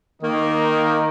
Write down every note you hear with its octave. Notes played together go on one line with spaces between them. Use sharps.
D#3 A#3 D#4